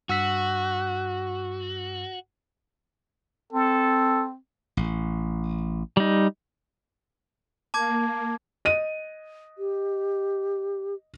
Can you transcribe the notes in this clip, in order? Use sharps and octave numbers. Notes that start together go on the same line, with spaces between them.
G2 F#4 E6 B6
C4 A4
A1
G3 D#4
A#3 A5 D6 G#6
D#5 D#7
G4